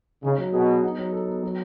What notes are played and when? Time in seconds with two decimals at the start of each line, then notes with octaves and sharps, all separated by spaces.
0.23 C#3 D#4
0.38 F#3
0.53 B2 G#4
0.68 B3
0.83 D#4
0.98 F#3
1.13 A4
1.28 B3
1.43 F#3